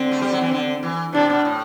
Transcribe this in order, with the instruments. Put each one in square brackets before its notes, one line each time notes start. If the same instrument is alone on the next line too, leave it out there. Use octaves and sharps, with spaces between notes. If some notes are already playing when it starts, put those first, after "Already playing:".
Already playing: [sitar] D3 [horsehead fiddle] C4
[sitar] A3
G3
F#3
E3
D3
E3
[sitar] C3 [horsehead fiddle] D4
[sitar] B2
A2